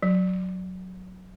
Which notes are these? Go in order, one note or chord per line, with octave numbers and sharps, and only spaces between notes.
F#3